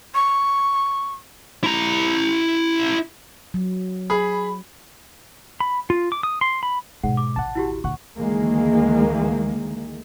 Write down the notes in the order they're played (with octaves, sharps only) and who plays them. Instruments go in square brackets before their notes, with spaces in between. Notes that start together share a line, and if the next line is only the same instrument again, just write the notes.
[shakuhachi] C#6
[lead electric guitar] E4 A#5
[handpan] F#3
[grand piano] G#4 [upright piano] B5
[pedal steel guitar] B5
F4
D6
D#6
C6
B5
[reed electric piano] G#2 G#3 [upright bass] B2 [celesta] F#5
[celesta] D6
[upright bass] A1 D#2 [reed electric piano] F#5 A5
[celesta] E4 F#4 G4
[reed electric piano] D2 F#5 [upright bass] A#2 [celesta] C#6
[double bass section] D2 D#3 E3 G#3 A#3